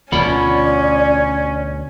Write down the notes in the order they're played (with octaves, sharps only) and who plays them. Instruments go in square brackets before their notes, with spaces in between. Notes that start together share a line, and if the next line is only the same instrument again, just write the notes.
[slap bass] D2 B2 D3 [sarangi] C#4 [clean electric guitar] F4 F#5 B5 [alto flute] D5